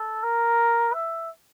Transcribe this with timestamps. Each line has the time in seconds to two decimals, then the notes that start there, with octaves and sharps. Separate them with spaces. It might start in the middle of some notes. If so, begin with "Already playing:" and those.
Already playing: A4
0.23 A#4
0.94 E5